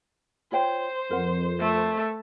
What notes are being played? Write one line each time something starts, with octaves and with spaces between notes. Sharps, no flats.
F4 C5 C#5 G5
F2 A#4 F#5
A3